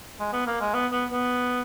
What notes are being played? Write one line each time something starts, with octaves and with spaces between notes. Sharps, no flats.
G#3
B3
A#3
G#3
B3
B3
B3